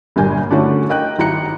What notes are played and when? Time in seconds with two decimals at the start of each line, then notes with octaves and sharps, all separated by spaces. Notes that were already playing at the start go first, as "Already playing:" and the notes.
0.16 G1 G2 A#2 A#4 G#5 G6
0.50 D3 A3 C#4 D4 E4 F#4
0.89 A#4 D#5 G5 F#6
1.18 G#1 E4 A#5 F#6 C#7